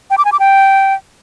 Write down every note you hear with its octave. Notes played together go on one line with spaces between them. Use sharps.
G5
D6
G#5
D6
G5